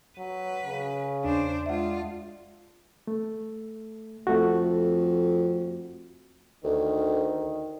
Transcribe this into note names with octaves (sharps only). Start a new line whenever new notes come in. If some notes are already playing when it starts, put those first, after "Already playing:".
F#3 B4
C#3
E2 D4 C5
G#3 D4 F4 E5 F#5
A3
F2 A3 F#4
D2 D#3